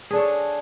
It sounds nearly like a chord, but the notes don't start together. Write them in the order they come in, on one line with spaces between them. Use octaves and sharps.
G#4 D4 A4 C#5